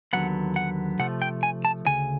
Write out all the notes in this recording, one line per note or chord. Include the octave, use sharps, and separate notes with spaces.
D#2 D3 F#3 B3 F#5
F#5
C3 F3 A3 F#5
G5
G#5
A5
D2 C#3 G#5